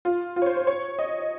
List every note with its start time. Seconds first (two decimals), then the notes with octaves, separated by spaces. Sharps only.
0.05 F4
0.36 F4
0.42 C#5
0.46 C5
0.57 C5
0.67 C#5
0.99 D#5